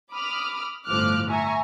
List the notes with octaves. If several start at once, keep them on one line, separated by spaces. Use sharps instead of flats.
B5 D6 D#6 F6
G1 A2 F3 D6 F6 F#6
E5 G#5 A#5 C#6